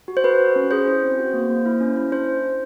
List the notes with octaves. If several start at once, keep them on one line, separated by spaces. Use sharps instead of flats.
F#4
C5
A4 B4
F#4
C#4
G#4 C5
E4
C4
F#4
A#3
A#3
E4
C#4
E4
D4 C5